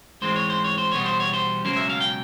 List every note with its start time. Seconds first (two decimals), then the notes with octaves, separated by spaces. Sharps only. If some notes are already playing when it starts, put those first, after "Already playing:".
0.21 G#2 E3 G#3 C4 C5
0.36 C#5
0.50 C5
0.64 C#5
0.78 C5
0.92 E2 B2 G3 B3 C#5
1.05 C5
1.20 C#5
1.33 C5
1.65 C#2 B2 F#3 A#3 C#4 C5
1.76 E5
1.90 F5
2.01 G5